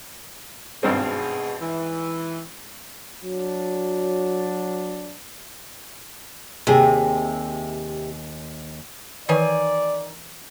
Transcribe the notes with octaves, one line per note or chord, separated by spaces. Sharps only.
G#1 G2 B2 C4 G#4
E3
F#3 D4
D#2 C3 G#4
D#3 E3 B4 C#5 D5 G#5